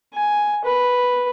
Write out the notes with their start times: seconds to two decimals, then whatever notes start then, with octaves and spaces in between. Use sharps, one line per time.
0.14 G#5
0.65 B4